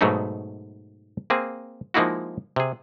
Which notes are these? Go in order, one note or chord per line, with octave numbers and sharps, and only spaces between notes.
G#2 B2 F#3 A3 B3 D#4
A#3 C4 G#4
F3 G#3 A#3 D#4 E4 F#4
C3 G#4